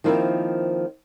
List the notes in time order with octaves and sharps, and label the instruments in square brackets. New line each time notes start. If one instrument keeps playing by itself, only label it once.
[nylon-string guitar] D#3 F3 A#3 C4 E4